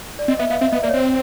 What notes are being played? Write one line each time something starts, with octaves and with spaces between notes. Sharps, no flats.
D5
C4 D#5
B3 E5
B3 F5
C4 E5
B3 D#5
A#3 D5
C#5
C4 C5